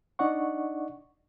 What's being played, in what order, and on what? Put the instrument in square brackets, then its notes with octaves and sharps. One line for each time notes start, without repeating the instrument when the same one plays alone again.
[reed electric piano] D4 D#4 D5 D#5 F#5 C#6